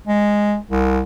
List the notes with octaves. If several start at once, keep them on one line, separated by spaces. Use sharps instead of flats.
G#3
C2